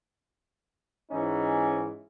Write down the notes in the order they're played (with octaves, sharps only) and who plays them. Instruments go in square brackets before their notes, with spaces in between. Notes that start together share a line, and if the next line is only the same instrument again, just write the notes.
[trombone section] G#2 E3 C#4 D#4